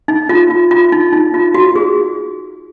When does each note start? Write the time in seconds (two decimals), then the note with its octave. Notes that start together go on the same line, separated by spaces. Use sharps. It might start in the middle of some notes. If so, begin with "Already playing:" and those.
0.08 D#4
0.29 F4
0.50 F4
0.71 F4
0.92 D#4
1.13 D#4
1.34 F4
1.55 F#4
1.76 G#4